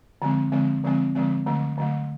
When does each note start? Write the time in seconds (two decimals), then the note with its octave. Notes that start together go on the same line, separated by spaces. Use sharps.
0.22 D3 F3 G#3 C4
0.52 D3 F3 G#3 C4
0.84 D3 F3 G#3 C4
1.15 D3 F3 G#3 C4
1.46 D3 F#3 A3
1.78 D3 F#3 A3